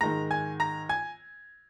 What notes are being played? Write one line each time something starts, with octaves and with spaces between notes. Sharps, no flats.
G#2 D#3 G#3 A#5 A#6
G#5 G#6
A#5 A#6
G#5 G#6